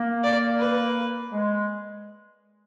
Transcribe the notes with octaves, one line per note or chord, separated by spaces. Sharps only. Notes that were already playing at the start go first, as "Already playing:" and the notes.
Already playing: A#3
D5
B4
G#3